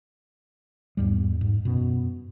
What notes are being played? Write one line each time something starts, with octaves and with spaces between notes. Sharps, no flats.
E2 G#2 G3
G#2
F#2 B2